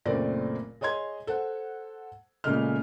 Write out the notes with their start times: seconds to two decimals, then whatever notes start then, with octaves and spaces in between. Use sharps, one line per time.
0.06 F#1 A#2 A3 C4 D5 A#6
0.81 G#4 C#5 D#5 C6 G#6
1.27 A4 C5 F#5
2.44 A#2 C#3 G#3 A3 D#5 F6